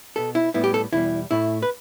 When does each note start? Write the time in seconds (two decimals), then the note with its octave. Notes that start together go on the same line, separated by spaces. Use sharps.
0.16 B2 B3 A4
0.35 E4
0.54 A2 G3 B3 E4
0.64 G4
0.74 A4
0.93 E2 B2 G3 E4
1.31 A2 A3 E4
1.62 B4